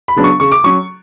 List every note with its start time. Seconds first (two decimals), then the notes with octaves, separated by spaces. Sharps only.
0.08 B5
0.16 C#3 F#3 B3 D4
0.24 C#6
0.40 C#3 C#6
0.52 D6
0.64 F#3 C#4 C#6